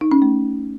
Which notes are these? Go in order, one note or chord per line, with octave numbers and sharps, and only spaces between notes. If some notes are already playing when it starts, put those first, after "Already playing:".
D#4
C#4
A3